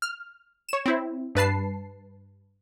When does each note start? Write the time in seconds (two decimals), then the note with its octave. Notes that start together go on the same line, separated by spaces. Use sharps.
0.02 F6
0.69 C#5 E7
0.86 C4 E4
1.35 G2 B4 A5 C7